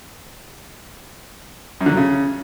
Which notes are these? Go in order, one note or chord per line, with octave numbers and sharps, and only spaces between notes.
F#2
D3
F#3
C#3